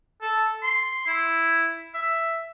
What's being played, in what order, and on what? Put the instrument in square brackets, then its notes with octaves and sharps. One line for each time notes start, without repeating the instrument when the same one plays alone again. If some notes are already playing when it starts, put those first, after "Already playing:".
[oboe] A4
C6
E4
E5